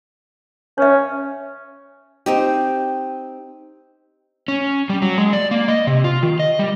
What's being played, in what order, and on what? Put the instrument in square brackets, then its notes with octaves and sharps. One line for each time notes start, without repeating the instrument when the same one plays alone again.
[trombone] C#4 [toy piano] C#5 E5
[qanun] C4 D#4 G4
[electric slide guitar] C#4
G3
F#3
G#3
D5
A#3
D#5
C3
F4
D#3
D#5
G3